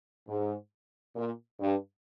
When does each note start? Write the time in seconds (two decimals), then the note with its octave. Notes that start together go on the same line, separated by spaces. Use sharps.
0.27 G#2
1.16 A#2
1.60 G2